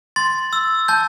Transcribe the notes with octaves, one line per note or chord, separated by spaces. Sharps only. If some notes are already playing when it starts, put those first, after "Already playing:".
C6 A6
E6
A5 G6